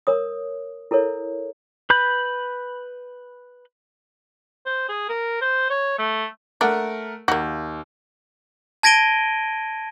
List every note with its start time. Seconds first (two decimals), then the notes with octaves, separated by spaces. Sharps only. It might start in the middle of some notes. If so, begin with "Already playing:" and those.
0.07 A#4 C#5 D#6
0.91 E4 A4 A#4 C#5
1.90 B4 B5 G6
4.66 C5
4.89 G#4
5.09 A#4
5.41 C5
5.70 C#5
5.99 A3
6.61 A3 D4 A#4 F#5
7.28 D#2 A#3 F#4
8.83 A5 G#6 A#6 D7 D#7 G7